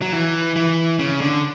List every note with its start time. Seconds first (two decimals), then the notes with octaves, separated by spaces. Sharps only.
0.02 F#3
0.13 E3
0.56 E3
0.99 C#3
1.21 D3